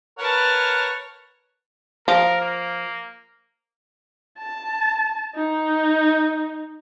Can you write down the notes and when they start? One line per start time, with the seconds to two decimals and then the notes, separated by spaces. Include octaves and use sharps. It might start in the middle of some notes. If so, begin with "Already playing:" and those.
0.19 A#4 B4 C#5 F#5 A5
2.08 F3 A#4
2.41 A#3
4.39 A5
5.35 D#4